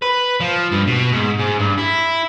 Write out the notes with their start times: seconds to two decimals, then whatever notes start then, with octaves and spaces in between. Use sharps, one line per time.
0.02 B4
0.40 F3
0.71 G2
0.87 B2
1.12 G#2
1.39 G#2
1.59 G2
1.78 E4